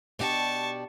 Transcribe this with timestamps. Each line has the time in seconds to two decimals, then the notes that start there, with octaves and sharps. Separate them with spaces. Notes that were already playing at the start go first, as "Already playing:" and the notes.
0.19 B2 D4 G4 A5 C#6